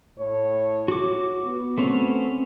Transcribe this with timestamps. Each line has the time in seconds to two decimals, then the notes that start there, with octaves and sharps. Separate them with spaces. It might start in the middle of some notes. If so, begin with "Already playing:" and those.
0.16 A2 C#5
0.88 F#4 D6
1.43 B3
1.78 A3 C4 C#4